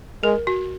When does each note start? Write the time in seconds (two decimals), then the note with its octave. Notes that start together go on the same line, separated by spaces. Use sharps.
0.23 G#3 A#4
0.47 F#4